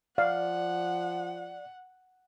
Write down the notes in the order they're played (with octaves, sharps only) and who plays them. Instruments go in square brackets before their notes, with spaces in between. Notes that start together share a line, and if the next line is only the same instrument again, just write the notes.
[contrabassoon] F3 [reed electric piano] D5 [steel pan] F5 [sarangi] F#5